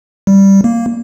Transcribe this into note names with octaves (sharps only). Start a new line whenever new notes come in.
G3
A#3